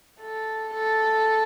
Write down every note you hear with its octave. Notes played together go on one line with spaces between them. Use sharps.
A4
A4